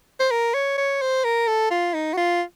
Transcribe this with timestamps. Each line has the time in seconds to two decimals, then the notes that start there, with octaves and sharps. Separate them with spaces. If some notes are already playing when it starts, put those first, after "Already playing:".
0.20 C5
0.31 A#4
0.54 C#5
0.78 C#5
1.02 C5
1.24 A#4
1.48 A4
1.71 F4
1.94 D#4
2.13 F#4
2.17 F4